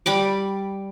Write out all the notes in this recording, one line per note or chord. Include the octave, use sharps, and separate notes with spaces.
G3 B5 D6